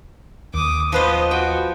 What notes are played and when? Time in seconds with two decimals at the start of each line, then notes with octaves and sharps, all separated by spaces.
0.54 D#2 D6 D#6
0.92 F3 B3 B4 C5 D#5
1.31 F#4 G5